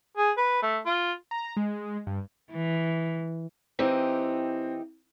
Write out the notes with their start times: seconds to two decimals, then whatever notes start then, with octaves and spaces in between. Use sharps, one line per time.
0.17 G#4
0.38 B4
0.62 A3
0.86 F4
1.31 A#5
1.57 G#3
2.07 G2
2.52 E3
3.79 E3 C4 D#4 G4